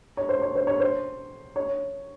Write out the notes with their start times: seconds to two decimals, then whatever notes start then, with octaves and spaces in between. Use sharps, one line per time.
0.17 C#5
0.29 C5
0.42 C#5
0.55 C5
0.67 C#5
0.80 C5
1.56 C#5